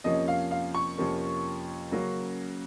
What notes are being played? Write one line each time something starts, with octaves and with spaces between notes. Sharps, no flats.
F2 C3 F3 A#3 C#4 D#5
F5
F5
C#6
F2 C3 F3 A#3 C#4
C#3 F#3 A#3 C#4